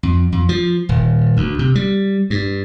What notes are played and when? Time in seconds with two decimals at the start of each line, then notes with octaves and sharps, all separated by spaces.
0.03 F2
0.32 F2
0.49 F3
0.89 D#1
1.37 D2
1.59 C3
1.75 G3
2.30 G2